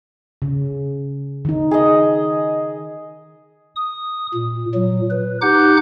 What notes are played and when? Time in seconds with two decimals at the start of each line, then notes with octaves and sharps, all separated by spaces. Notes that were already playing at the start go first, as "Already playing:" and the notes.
0.42 C#3
1.45 D#3 D#4
1.71 G#4 D#5
3.76 D#6
4.34 A#2
4.74 A#2 F#3
5.10 B4
5.42 D#4 G4 F#5 D6 F#6 G6